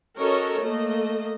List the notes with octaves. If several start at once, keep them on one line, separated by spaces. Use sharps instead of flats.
C#4 F#4 A4 A#4 C#5 D#5
A3 A#3 D#5